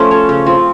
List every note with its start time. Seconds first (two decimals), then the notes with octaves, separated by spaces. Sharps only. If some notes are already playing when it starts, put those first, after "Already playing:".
Already playing: F3 A3 C#4
0.11 A4 C#5
0.29 C#3
0.46 F3 C4